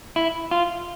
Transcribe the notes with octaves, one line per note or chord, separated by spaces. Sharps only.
E4
F4